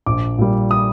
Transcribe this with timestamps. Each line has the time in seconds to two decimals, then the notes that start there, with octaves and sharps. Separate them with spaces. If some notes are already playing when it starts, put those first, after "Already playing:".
0.06 A#1 D6
0.38 A#2 G3
0.71 D#6